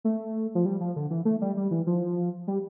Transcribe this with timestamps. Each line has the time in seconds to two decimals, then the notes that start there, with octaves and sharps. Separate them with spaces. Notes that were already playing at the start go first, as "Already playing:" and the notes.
0.04 A3
0.55 F3
0.66 G3
0.81 F3
0.96 D3
1.10 E3
1.25 A3
1.41 G3
1.57 G3
1.71 E3
1.87 F3
2.47 G3